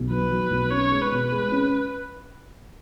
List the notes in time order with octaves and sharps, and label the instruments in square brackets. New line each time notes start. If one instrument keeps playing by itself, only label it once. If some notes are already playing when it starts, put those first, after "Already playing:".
Already playing: [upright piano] B1
[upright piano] F#3 [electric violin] B4
[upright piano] F#3
B1
[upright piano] C#4 [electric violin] C#5
[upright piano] G#3
[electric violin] B4
[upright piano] B2
G#3
C#4